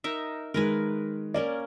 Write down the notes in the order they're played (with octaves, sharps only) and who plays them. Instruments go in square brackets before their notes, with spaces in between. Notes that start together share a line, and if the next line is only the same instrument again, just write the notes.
[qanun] D#4 A#4 E5
[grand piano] D#3 G#3 [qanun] A#4 B4 G#5
[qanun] A#3 C#4 A#4 [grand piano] D5